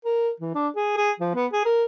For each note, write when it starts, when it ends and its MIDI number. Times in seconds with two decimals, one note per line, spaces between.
0.05 0.30 70
0.40 0.53 52
0.55 0.68 62
0.76 0.95 68
0.97 1.11 68
1.20 1.31 53
1.35 1.46 59
1.53 1.65 68
1.65 1.85 70